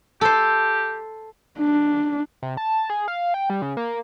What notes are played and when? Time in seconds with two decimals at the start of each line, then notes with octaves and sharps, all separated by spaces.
0.21 G4 A4 C5
1.59 D4
2.42 C3
2.57 A5
2.90 G#4
3.08 F5
3.34 G5
3.50 G3
3.62 C#3
3.77 A#3